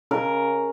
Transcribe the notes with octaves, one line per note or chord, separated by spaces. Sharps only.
C#3 A#4